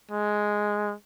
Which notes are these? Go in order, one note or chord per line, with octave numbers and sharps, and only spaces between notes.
G#3